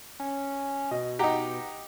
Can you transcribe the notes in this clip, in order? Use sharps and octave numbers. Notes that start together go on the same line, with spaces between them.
C#4
B2 D#5
D#4 G4 F#5 A#5